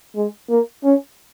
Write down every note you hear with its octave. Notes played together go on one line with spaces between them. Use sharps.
G#3
A#3
C#4